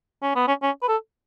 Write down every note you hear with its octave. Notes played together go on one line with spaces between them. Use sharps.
C#4
B3
C#4
C#4
B4
A4